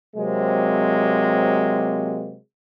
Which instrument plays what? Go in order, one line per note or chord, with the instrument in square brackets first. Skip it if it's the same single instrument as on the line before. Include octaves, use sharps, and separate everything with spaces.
[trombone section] C3 F#3 G#3 A#3 C4